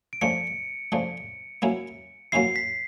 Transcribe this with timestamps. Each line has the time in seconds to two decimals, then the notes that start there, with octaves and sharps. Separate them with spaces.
0.13 D7
0.21 C#3 F3 A3 D4 C#7
0.92 C#3 F3 A3 D4
1.62 F#3 A#3 C#4 E4
2.32 F#3 A#3 C#4 E4 C7
2.56 B6